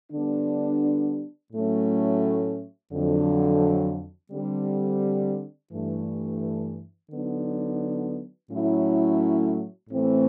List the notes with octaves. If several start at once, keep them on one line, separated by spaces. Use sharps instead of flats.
D3 G3 B3 D4
A2 F#3 A3 C#4
F2 D3 F#3
D3 G3 C4
G2 E3 A3
D3 F#3 B3 D#4
A2 F#3 A3 C#4 E4
A2 E3 A3 C4